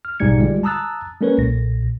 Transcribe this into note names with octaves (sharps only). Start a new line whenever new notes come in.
F6
A#1 G#2 B2 G3 G#6 C#7
D3 G3 G#3 F4
A5 A#5 D#6 E6 F#6 A6
G#3 A#3 C#4 A#4 B4 C#5
B1 A#2 A#6